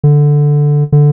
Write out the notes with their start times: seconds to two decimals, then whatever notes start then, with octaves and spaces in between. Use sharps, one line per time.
0.04 D3
0.92 D3